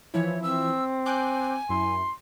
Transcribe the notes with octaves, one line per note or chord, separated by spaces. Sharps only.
E3 F3 E4 C#5
C4 E6
G#5 D6 F#6 G6
F#2 E4 C6